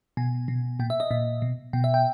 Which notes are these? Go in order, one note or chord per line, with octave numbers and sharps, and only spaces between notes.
B2 G#5
B2
A#2 G5
E5
D#5
A#2 E5
B2
B2 G5
E5
G5